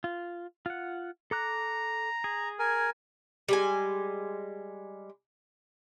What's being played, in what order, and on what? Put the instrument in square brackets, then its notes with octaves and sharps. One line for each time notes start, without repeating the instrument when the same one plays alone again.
[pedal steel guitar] F4
F4 F#5
[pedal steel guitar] A4 D6 F#6 [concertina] A#5
[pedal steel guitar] G#4
[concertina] A#4 G#5
[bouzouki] G3 G#3 G#5